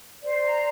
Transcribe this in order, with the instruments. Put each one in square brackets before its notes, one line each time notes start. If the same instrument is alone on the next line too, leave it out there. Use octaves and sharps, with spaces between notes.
[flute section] C5 [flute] D5
[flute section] A#5